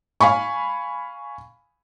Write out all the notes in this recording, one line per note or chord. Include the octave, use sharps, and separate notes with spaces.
F5 G#5 B5 C#6